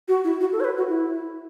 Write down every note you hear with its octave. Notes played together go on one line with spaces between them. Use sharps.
F#4
E4
F#4
A4
C#5
B4
F#4
E4